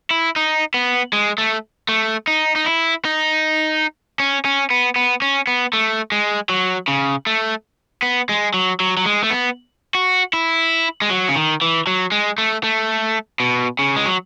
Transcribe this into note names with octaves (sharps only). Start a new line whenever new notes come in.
E4
D#4
B3
G#3
A3
A3
D#4
D#4
E4
D#4
C#4
C#4
B3
B3
C#4
B3
A3
G#3
F#3
C#3
A3
B3
G#3
F#3
F#3
F#3
G#3
A3
B3
F#4
E4
G#3
F#3
C#3
D#3
E3
F#3
G#3
A3
A3
B2
C#3
G#3
F#3